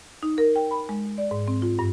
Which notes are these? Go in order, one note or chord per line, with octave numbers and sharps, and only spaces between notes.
D#4
A#4
G5
B5
G#3
D5
G#2
C4
F4
G2